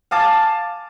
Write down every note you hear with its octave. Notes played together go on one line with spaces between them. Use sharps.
F5 G#5 A5 D6 A6